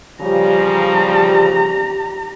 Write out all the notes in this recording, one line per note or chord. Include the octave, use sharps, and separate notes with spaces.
C#3 F3 G3 G4 A#5